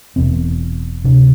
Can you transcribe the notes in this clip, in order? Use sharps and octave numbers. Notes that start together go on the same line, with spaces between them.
E1 E2 B2 C4
D2 C3 D4